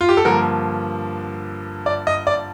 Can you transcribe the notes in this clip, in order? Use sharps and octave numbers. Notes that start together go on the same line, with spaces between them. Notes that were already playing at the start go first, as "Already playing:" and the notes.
F4
G4
A4
G2 D3 F3 A#3 A#4
D5
D#5
D5